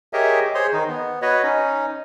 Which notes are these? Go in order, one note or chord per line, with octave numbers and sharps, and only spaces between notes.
G4 G#4 A#4 C#5 D#5 E5
G#4 C5 C#5 C6
D#3 D#4
B3
F#4 B4 C#5 D#5
C#4 D#4